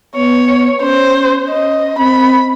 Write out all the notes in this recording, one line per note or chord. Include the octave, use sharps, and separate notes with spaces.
B3 C#5
C#4 C5
D#5
C4 B5